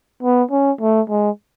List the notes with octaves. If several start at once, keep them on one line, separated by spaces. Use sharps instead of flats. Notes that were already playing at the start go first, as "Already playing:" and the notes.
B3
C#4
A3
G#3